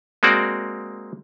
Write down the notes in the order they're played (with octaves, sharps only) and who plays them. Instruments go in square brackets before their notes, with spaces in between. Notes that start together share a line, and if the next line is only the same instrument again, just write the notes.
[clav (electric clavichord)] G#3 A#3 C4 F#4 D5